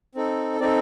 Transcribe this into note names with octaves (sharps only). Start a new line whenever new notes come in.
C4 D#4 A4
C4 D#4 A4 D5